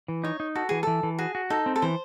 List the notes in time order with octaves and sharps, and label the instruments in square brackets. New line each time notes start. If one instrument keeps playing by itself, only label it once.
[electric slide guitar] E3
[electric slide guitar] D#4 [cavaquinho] C#5
[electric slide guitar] D#4
[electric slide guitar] F#4 [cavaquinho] A4
[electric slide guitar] E3 [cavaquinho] G#4
[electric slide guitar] E3 [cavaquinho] A4
[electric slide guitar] E3
[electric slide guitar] F#4 [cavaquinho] G#4
[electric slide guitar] F#4
[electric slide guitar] D#4 [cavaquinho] A4
[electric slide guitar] C4
[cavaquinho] A4
[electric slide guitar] E3 [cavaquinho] C5